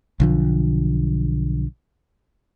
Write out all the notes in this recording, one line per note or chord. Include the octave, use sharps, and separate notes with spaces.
B1 D3 F3